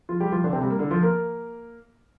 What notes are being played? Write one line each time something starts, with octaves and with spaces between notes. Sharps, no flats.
F3 F4
G3 G4
F3 F4
D3 D4
C3 C4
G3
A#3
D3 D4
F3 F4
A#3 A#4